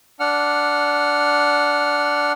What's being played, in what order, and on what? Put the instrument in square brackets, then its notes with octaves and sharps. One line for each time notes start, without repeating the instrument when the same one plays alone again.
[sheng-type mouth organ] D4 F#5 F6